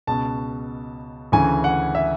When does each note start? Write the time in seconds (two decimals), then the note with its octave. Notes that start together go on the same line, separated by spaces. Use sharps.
0.07 C#2 B2 A5
1.32 D2 C#3 E3 G#5
1.64 F#5
1.95 E5